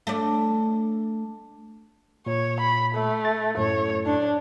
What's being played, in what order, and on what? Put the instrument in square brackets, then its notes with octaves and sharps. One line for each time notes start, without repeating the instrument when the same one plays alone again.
[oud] A3 D4
[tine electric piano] A#2 [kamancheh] C#5
[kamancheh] B5
A3
[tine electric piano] A6
[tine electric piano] F#2 A2 A4 [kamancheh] C#5
[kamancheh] D4